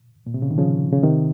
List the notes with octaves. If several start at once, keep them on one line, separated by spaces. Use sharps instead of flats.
A#2
C3
C#3
D#3
C#3 F3
C#3
C3 D#3